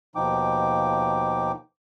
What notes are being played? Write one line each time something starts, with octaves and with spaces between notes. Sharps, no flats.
D#2 B2 F3 D#4 G5 D6